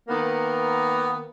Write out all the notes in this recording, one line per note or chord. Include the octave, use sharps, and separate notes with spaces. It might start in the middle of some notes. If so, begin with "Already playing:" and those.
D#3 A#3 B3